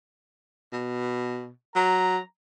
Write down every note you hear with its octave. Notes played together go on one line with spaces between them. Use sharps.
B2
F#3 A#5